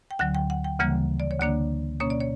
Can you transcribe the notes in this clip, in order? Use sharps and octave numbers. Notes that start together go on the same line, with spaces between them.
G5
D2 D3 F#3 F#5
G5
F#5
G5
D2 C#3 E3 G3 A#3 F#5
D5
C#5
D2 D3 A#3 D4 D5
B2 A#3 C#4 C#5
D5
C#5